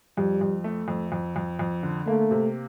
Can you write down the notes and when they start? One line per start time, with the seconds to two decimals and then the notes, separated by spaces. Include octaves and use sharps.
0.17 F2 G3
0.41 F2
0.64 A3
0.88 F2
1.12 F2
1.36 F2
1.59 F2
1.83 D3
2.07 A3 A#3
2.31 C3